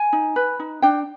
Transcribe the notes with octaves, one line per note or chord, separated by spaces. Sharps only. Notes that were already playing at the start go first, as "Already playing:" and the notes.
Already playing: G#5
D#4
B4
D#4
D4 G5